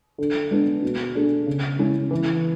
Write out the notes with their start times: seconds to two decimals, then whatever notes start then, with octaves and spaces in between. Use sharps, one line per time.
0.18 D3
0.51 G#3 B3 D4
0.82 B2
1.15 A3 D4 G#4
1.47 C#3
1.79 G#3 C#4 E4
2.11 E3